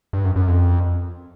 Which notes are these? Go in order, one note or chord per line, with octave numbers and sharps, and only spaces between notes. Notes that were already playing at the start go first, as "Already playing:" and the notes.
G2
F#2
F#2
F2